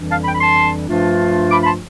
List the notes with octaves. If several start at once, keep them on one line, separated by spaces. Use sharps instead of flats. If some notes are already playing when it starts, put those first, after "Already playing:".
Already playing: F2 E3 G3 D4
F5 A5
G5 B5
B5
A5 C6
G2 F3 A3 D4 F4
B5 D6
B5
A5 C6